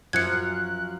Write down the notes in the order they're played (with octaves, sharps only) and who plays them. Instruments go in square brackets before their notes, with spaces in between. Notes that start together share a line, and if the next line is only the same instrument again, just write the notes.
[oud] F#2 F3 [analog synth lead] F#6 [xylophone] G#6 C#7